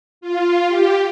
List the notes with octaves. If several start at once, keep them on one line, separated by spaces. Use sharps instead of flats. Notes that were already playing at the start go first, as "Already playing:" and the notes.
F4
G4